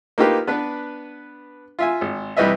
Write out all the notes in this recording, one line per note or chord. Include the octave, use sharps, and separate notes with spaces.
A#3 D#4 F4 G4 B4
B3 D4 B4
F4 E5 G#5
G#1
C2 E3 G3 B4 D#5 E5